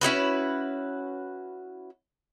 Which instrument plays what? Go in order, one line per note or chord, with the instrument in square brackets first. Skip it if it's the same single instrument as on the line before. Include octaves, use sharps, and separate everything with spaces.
[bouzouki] C#4 E4 F#4 B4